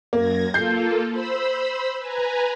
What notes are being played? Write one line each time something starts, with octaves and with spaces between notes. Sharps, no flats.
F#2 A#3 G#6 A#6
A#3 F4 A4 G6 C7
C5 B5 E6
B4 G#5 A#5